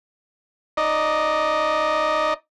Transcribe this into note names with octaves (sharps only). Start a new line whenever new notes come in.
D#4 D5 D#5